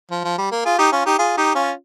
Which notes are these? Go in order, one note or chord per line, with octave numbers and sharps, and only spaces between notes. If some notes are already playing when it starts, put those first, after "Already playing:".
F3
F3
G3
A#3
F4 G#4
D#4 G4
C#4 F4
D#4 G4
F4 G#4
D#4 G4
C#4 F4